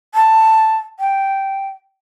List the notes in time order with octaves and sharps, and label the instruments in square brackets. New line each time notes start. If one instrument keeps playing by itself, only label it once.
[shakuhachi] A5
G5